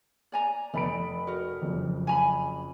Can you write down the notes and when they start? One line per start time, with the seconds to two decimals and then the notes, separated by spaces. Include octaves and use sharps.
0.32 D5 G#5 A#5
0.74 F1 D5 B5 D7
1.27 F#4 A#4
1.62 F#1 F2
2.07 G#5 A#5 B5